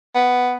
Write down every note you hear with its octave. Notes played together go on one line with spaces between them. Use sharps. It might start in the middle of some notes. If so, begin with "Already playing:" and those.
B3